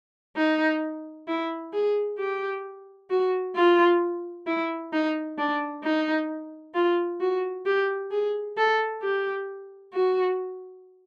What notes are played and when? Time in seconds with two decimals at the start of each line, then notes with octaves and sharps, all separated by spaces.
0.36 D#4
1.27 E4
1.73 G#4
2.19 G4
3.10 F#4
3.55 F4
4.47 E4
4.93 D#4
5.38 D4
5.84 D#4
6.74 F4
7.20 F#4
7.66 G4
8.11 G#4
8.57 A4
9.02 G4
9.94 F#4